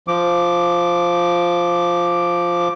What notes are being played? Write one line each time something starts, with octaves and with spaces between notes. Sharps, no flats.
F3 D6